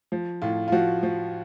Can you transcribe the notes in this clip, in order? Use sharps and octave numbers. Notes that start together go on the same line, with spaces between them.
F3
A2 F4
F4
F3 F#4
F3